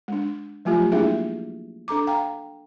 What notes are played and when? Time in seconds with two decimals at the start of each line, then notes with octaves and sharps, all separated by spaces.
0.08 G#3 D4
0.65 F3 F#3 A3 F4 G4
0.92 G#3 A#3 D4 E4 G#4 E5
1.88 D4 A4 A#5 D6
2.07 F5 G5 A#5